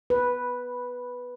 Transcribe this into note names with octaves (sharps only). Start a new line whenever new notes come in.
B4